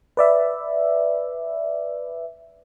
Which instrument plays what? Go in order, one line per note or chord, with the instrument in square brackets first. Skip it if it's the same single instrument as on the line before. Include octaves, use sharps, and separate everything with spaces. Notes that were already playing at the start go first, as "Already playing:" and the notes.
[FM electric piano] B4 D5 E5